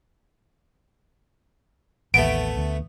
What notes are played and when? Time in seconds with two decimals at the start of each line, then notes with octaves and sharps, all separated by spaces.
2.14 A1 D#2 A3 B3 D7
2.57 D2